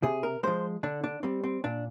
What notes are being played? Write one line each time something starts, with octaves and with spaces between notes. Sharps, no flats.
C3 G#4
A#4
F3 G#3 C5
D3 D4
D4
G3 C4
C4
A#2 D4